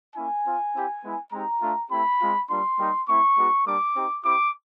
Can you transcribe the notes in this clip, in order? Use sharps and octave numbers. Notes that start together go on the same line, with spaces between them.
A#3 C#4 E4 G#5
C4 F4
C4 E4 G4
G#3 B3 E4
G#3 C4 D#4 G4 A#5
A3 D4 F4
A3 C4 E4 G4 B5
G#3 C4 F4
G3 A#3 D4 F4 C6
G3 A#3 D#4 G4
A3 C4 E4 C#6
G#3 B3 D#4 F#4
G3 A#3 D4 G4 D6
C4 D#4 G4
C4 E4 G4 D6